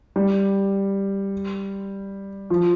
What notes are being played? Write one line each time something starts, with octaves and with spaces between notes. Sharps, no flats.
G3
F3